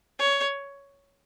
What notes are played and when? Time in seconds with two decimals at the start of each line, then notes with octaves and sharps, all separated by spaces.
0.19 C#5